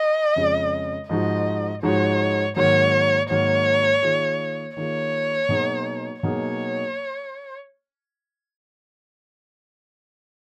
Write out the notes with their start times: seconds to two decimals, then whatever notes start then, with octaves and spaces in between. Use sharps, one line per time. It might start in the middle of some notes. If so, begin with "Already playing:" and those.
Already playing: D#5
0.36 F2 C#3 G#3 C#4 G#4
1.09 G#2 F3 G#3 D#4 F#4 D#5
1.83 G#2 F3 G#3 D#4 F#4 C#5
2.56 G#2 D#3 F#3 A#3 C#5
3.30 G#2 D#3 F#3 A#3 C#5
4.03 D#3 A#3 F4 G#4
4.77 D#3 A#3 F4 G#4 C#5
5.49 B2 F#3 A#3 D#4 G#4
6.22 B2 F#3 A#3 D#4 G#4 C#5